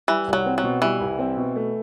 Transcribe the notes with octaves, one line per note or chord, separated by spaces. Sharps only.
E3 G3
C2
F#3
C4
F#3
B2
E3 G3
C2
C4
B2
A3